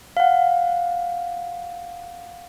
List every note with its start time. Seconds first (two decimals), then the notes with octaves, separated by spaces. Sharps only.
0.17 F5 F#5